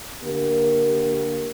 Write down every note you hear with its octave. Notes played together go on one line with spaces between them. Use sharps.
D3 A#3 G4 A#4